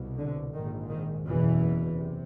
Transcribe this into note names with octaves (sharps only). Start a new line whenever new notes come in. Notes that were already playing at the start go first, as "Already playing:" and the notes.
Already playing: C2 B2
D3
A#1 G#2 D#3
D#3
F#1 E2 B2 E3
C3